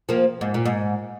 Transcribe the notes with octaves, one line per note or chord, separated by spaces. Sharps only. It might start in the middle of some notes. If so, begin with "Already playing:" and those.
F3 A#3
G#2
A#2
G#2